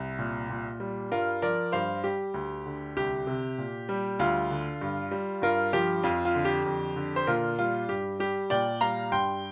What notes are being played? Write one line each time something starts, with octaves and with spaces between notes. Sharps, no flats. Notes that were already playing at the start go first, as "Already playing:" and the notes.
Already playing: C2
A#2
A#2
G3
G2 F4 A#4
F3 A#4 D5
G2 C5 F5
G3 G4
D2
D3
C2 G4
C3
A#2
G3
D2 F4
D3
G2
G3
G2 F4 A#4
F3 G4
F2 F4
F4
D3
G4
F2
D3
C5
A#2 F4 A#4
G3 F4
G2 G4
G3 G4
A#2 D5 G5
G3 F5 A#5
G2 G5 C6